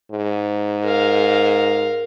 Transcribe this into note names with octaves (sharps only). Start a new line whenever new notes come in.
G#2
A#4 F5